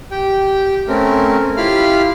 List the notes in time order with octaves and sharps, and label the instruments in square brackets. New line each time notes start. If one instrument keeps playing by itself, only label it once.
[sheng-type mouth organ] G4 G5
A3 C4 C#4 A#4
E4 F4 G4 F5 B5 F6